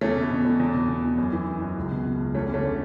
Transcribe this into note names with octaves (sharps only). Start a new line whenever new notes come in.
E2 A3 C#4
B2
B2
E2
E2
B2
B2
E2
F#2
E3
E3
F#2
C#2
B2
B2
C#2
E2 A3 C#4
D3 A3 C#4
D3